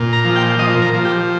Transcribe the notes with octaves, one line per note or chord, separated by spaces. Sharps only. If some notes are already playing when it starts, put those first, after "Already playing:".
Already playing: A#2
A#5
F3
G5
F3 D#5
A#4
F3
G4